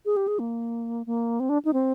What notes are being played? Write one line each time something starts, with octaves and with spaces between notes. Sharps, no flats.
G#4
G4
G#4
A#3
A#3
C4
D4
D#4
C4